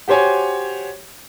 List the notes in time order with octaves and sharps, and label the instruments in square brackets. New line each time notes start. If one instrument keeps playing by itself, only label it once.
[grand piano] F#4 G4 C5 C#5 G#5